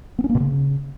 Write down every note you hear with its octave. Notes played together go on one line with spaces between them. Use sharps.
B3
C#4
A#3
B2
C#3